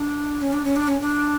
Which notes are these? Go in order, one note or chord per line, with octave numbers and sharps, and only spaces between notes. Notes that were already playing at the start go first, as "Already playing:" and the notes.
Already playing: D4
C#4
D4
C#4
D4
C#4
D4